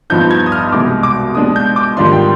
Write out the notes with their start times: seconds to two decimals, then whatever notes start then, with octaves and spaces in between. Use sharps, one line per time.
0.10 G2 F3 B3 D#4 G6
0.31 G#6
0.46 D#6
0.52 F6
0.72 C2 B2 G#3 D6
1.03 D6
1.35 B2 G#3 D4 D#6
1.56 G6
1.76 D6
1.97 G#2 D#3 G3 D4 F4 C6
2.13 G5